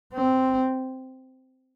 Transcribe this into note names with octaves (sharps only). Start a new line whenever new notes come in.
C4